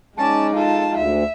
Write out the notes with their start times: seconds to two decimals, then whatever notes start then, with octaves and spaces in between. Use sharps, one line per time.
0.18 G#3 C#4 D#4 D5 A5
0.55 F4 A4 A5
0.97 D2 E5